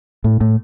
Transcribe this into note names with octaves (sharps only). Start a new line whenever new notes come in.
A2
A2